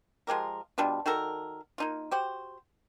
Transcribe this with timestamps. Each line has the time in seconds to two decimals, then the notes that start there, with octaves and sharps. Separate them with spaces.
0.27 F3 G#3 G4 A#4
0.78 B2 G3 D4 F4
1.06 D#3 F#4 A4 A#4
1.78 A#3 D#4 F4
2.11 F#4 G4 C5